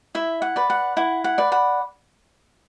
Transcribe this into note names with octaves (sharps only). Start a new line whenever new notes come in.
E4 E5
F#5
B4 D5
F#5
E4 F#5
F#5
B4 D5
F#5 B5